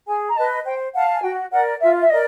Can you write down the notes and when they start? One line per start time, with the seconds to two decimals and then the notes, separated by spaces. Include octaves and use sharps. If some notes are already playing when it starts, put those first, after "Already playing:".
0.07 G#4 G#5
0.29 A#5
0.36 B4 D#5 A5
0.65 C5 G5
0.94 F5 F#5 A5
1.14 G#5
1.23 F#4 G5
1.52 A#4 D5 F#5
1.81 F4 E5
2.01 E5
2.10 A#4 D5 D#5